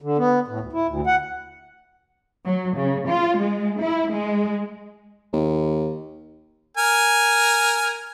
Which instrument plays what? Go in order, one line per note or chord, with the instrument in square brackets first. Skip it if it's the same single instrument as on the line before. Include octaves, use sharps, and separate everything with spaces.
[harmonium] D3
B3
A2
D2
E4
D2
F#5
[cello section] F#3
C#3
F4
G#3
E4
G#3
[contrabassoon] D#2
[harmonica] A#4 G#5